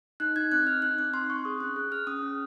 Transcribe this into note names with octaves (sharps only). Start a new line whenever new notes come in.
D#4 F#6
D#4 G#6
C4 F#6
D#4 F6
D#4 F#6
C4 F#6
C4 C6
C4 C#6
G#4 D#6
C#4 F#6
G#4 F#6
G#4 F6
C#4 D#6
C#4